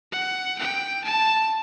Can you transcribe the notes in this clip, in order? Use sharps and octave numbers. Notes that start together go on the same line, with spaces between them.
F#5
G5
A5